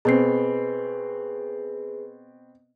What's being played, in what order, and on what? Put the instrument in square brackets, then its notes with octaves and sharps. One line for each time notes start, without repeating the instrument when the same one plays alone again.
[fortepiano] B2 C4 [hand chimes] G#4 B4 C7